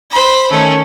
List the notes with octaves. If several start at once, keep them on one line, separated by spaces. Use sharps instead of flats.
C5 B5
D#3 A3 C#4